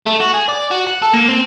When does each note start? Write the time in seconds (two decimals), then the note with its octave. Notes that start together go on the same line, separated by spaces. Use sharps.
0.06 A3
0.20 F#4
0.34 G#4
0.49 D5
0.71 F#4
0.87 F#5
1.02 A4
1.13 A#3
1.28 C4